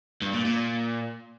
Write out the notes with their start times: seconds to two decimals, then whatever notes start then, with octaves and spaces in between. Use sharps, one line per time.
0.22 G2
0.33 A#2
0.45 A#2